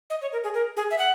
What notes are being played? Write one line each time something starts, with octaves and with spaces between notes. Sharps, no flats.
D#5
C#5
A#4
G#4
A#4
G#4
E5
F#5